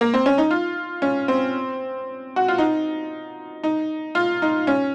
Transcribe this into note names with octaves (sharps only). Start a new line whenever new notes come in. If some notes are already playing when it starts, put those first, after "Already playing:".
A#3
C4
C#4
D#4
F4
C#4
C4
F#4
F4
D#4
D#4
F4
D#4
C#4